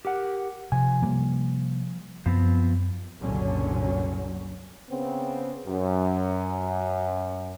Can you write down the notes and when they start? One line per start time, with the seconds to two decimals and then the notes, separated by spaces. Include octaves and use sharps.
0.05 G4 A#4 F#5
0.72 C3 F3 G#5
1.02 C3 G3 A#3
2.26 F#2 F3 B3 C4
3.19 F#1 C2 A#2 D3 F#3 C#4
4.90 C#3 B3 C4
5.67 F#2